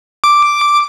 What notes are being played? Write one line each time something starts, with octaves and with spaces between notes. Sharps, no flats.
D6